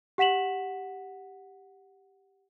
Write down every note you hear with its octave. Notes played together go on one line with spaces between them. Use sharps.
G4 F#5 B6 E7 F#7